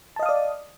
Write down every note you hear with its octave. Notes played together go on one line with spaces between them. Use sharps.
D5 D#5 F5 A5 D#6